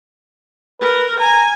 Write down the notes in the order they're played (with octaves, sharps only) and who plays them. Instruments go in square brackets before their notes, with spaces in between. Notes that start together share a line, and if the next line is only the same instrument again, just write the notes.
[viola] A#4 [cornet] B4
[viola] G#5 [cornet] A#5